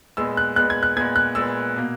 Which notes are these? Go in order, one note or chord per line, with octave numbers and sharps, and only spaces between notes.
A#2 G#3 B3 E6
F#6
A#2 G#3 B3 F#6
G#6
F#6
A#2 G#3 B3 G#6
F#6
A#2 G#3 B3 E6
B2 A#3